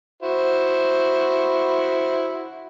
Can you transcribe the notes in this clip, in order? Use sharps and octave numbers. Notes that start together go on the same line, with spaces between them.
E4 F#4 C5